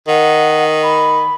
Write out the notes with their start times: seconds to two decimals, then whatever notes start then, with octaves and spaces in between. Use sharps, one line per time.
0.08 D#3 F#5
0.82 B5